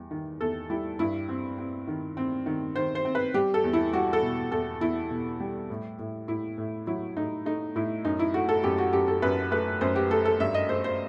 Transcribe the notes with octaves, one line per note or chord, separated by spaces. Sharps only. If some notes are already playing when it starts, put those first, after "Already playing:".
Already playing: E2 G3
D#3
E2 A4
G3 E4
G2 E4
C4
C4
D#3
C4
D#3
D#3 C5
C5
C4
B4
G3 G4
A4
E2
E4
G3 F#4
A4
B2
E2 A4
E2 E4
B2
G3
A2
A2
A2 E4
A2
F#3 E4
A2 D#4
A3 D#4
A2 E4
F#2 D#4
E4
A3 F#4
A4
F#2 G4
F#4
F#2 G4
A4
F#2 B4
A3 B4
F#2 C5
G4
A3 A4
A4
G2 E5
D#5
A3 C5
C5